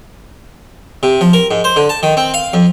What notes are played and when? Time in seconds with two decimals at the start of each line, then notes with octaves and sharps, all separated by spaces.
1.03 C3
1.21 F3
1.33 A#4
1.51 G#2
1.64 C5
1.76 D3
1.89 A5
2.03 D#3
2.17 C4
2.34 F5
2.53 F2